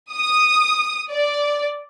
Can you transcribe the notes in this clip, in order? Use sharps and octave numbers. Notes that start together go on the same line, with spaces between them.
D#6
D5